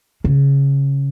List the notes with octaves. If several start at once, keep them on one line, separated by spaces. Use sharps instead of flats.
C#3